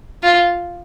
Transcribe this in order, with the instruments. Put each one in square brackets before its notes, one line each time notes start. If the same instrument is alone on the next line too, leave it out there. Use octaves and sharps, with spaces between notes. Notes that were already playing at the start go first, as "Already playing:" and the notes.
[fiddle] F4